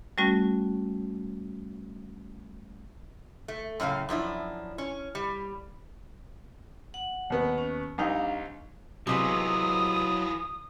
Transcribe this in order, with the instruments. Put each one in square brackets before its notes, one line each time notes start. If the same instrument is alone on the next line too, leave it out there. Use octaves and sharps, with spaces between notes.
[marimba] G3 A3 C#4 F#4
[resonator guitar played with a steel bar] A3
F#2 A2 C#3 F5
F#2 F3 D4 E4
C#4
G3
[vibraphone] F#5
[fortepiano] D#2 B3
[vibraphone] C#4
[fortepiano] C2 D#4 [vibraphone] D4 F5
[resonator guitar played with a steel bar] C3 G#3 B3 [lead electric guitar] E3 F4 [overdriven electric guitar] F#3 [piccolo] D#6